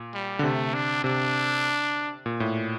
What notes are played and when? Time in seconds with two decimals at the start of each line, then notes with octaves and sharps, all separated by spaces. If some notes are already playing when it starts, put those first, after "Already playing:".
Already playing: A#2
0.14 G3
0.39 D3
0.43 C3 A3
0.74 D4
1.04 C3 D4
2.26 A#2
2.40 A2